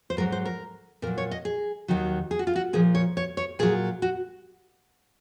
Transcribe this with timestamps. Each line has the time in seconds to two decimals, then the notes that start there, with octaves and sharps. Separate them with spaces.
0.10 C5
0.17 G#2 F#3 A#4
0.32 C5
0.45 A#4
1.02 A#2 A#4
1.07 F#3
1.18 C#5
1.31 D#5
1.45 G#4
1.88 D#2 D#3 F#3
2.31 G#4
2.39 F#4
2.47 F4
2.56 F#4
2.73 A#2 F3 G#4
2.95 C#5
3.17 C#5
3.37 C#5
3.59 A#2 F#3 G#4
4.02 F#4